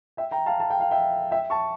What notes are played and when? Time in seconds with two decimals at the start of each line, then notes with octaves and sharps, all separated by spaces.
0.17 E5 G5
0.31 G5 A#5
0.46 F5 A5
0.60 A5
0.70 G5
0.80 F5
0.91 E5 G5
1.31 E5 G5
1.50 A5 C#6